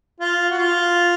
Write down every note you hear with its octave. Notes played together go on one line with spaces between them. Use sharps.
F4
F#4
F4